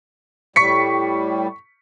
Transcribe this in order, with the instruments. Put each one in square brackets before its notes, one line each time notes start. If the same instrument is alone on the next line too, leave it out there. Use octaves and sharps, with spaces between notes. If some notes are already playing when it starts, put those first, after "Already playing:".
[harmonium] A2 G3 [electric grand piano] C#6 B6 C#7